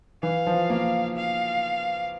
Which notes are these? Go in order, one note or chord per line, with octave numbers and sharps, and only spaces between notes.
E3 F5
F3
A#3
F5